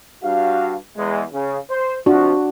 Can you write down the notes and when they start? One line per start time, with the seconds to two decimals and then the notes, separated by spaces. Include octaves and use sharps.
0.23 G2 F#4 F5
0.97 E2 G#3
1.33 C#3
1.70 C5
2.06 C3 F3 D4 F#4